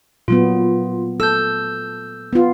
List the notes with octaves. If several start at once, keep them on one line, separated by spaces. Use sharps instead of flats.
A#2 F#3 B3 F4
A4 E6 G6
B3 F4